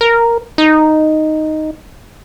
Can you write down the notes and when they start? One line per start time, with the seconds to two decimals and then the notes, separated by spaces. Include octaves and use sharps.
0.01 A#4
0.58 D#4